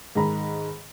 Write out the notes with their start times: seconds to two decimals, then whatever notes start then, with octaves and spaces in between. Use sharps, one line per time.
0.15 G#2 D#3 G#3 A#5 B5